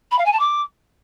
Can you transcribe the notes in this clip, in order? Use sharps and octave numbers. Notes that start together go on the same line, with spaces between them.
B5
F5
G#5
A5
D6